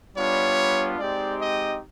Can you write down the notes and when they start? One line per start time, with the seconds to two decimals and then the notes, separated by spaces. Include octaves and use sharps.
0.16 G3 B3 D4 F4 C#5
0.99 G#3 C4 D#4 G4 D5
1.40 D#5